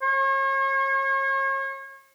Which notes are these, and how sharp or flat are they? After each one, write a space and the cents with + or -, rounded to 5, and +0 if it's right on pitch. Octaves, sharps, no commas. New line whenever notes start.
C#5 -40